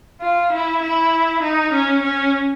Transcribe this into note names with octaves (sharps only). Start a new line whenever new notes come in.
F4
E4
E4
D#4
C#4
C#4